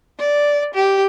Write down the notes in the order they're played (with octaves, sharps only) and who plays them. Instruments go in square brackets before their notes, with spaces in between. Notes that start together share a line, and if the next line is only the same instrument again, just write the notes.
[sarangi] D5
G4